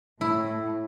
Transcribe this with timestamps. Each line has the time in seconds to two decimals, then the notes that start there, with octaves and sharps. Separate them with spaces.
0.21 A2 E4